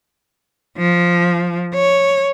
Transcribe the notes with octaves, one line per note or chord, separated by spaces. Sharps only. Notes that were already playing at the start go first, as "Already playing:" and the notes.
F3
C#5